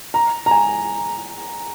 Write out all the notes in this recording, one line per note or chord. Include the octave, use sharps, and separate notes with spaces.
A#5
A#5
G#5